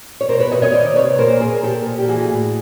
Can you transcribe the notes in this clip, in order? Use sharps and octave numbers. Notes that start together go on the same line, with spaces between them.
C#5
B2 A#4 C5
B4 C#5
B2 C#5 D#5
C#5 D#5
D#3 C5 D5
C3 B4 C#5
A#2 A#4 C5
A#2 G#4 A#4
A#2 G4 A4
A#2
G4
E3 F#4 G#4
A2